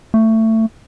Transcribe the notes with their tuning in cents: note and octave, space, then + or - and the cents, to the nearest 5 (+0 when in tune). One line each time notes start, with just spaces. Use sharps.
A3 +20